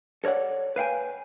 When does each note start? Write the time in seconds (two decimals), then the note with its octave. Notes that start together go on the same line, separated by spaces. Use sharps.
0.24 A4 A#4 C#5 D5 F#5
0.76 B4 F5 G5 G#5